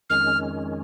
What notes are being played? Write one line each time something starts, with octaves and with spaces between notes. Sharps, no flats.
F2 D#3 G#3 C#4 F6